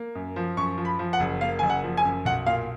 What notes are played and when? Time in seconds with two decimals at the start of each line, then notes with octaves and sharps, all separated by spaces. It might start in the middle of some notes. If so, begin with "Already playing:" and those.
Already playing: A#3
0.15 F#2
0.36 F3
0.57 F#2 C#6
0.78 F3
0.85 B5
0.99 F3
1.13 F#5
1.20 F#1
1.41 A#3 F5
1.59 F#1 G#5
1.70 F#5
1.84 F3
1.97 G#5
2.05 F#2
2.25 B1 F#5
2.47 A#2 F5